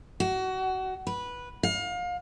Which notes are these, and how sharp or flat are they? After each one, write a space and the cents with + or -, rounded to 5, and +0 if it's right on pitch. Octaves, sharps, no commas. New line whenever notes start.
F#4 +25
B4 -10
F5 +30